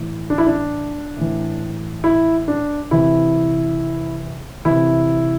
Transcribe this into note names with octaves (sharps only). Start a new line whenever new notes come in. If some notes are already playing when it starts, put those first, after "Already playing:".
Already playing: A2 E3
D4
E4
D4
A2 E3
E4
D4
C3 E3 E4
C3 E3 E4